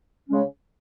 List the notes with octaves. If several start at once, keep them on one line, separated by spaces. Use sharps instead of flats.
C#3 G#3 C#4